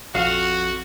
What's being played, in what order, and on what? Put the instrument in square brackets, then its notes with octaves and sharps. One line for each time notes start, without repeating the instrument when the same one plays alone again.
[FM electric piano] A#1 [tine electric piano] F2 [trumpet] F#4 [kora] F5